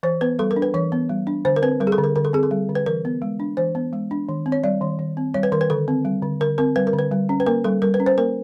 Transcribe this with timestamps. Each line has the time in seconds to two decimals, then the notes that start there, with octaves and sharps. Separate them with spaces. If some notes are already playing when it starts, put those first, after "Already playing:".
0.03 E3 C5
0.21 B3 B4
0.39 G3 A4
0.51 A#4
0.56 D4
0.62 B4
0.74 E3 C#5
0.92 B3
1.09 G3
1.27 D4
1.45 D3 C5
1.56 A#4
1.62 C4 B4
1.80 G3 A#4
1.87 G#4
1.92 A4
1.98 D3
2.04 A#4
2.16 D3 A#4
2.25 A4
2.33 C4 G#4
2.43 A4
2.51 G3
2.69 D3
2.75 B4
2.86 E3 A#4
3.05 B3
3.22 G#3
3.40 D4
3.57 E3 C5
3.75 B3
3.93 G#3
4.11 D4
4.29 D#3
4.46 C4
4.52 C#5
4.64 G3 D5
4.81 D#3
4.99 D#3
5.17 C4
5.34 G3 C#5
5.43 B4
5.52 D#3 A#4
5.61 B4
5.70 D3 A4
5.88 C4
6.05 G3
6.22 D3
6.40 D3 A#4
6.58 C4 A#4
6.76 G3 B4
6.87 A#4
6.93 D3
6.99 B4
7.11 G3
7.29 C#4
7.40 B4
7.46 A#3 A#4
7.64 G3 A4
7.82 G3 A#4
7.94 B4
8.00 C#4
8.06 C5
8.18 A#3 A#4